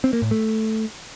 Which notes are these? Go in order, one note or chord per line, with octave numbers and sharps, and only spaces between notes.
C4
A#3
A2
A3